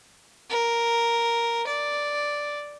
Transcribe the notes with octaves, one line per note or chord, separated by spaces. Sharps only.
A#4
D5